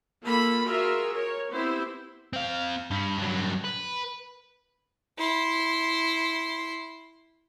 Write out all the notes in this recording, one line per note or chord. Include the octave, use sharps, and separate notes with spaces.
A#3 F4 A4 B5
F4 F#4 G#4 A#4 E5
A#4 C#5
B3 C4 E4 G4 C5
C4 F5
G2
G2 F#3
B4
E4 C6